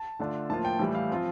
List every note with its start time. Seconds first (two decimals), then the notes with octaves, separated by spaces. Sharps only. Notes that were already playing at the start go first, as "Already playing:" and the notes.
Already playing: A5
0.19 D3 A3 D4 F4
0.50 A2 F3 A#3 F4 A5
0.65 G5
0.79 A2 E3 G3
0.95 F5
1.10 F3 C4 F4